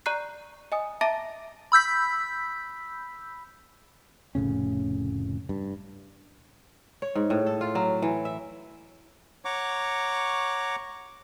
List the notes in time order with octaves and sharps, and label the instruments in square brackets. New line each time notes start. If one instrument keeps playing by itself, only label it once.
[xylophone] D5 A#5 C#6 F#6 C7
D#5 G#5 D#6
E5 A5 A#5 D6 A6 A#6
[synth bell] B5 E6 G6 B6
[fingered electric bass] F1 A2 C#3 C#4
G2
[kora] C#5
G#2
A2
A4
F4
F#3
E3
E5
[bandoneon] C#5 F#5 A#5 C#6 D6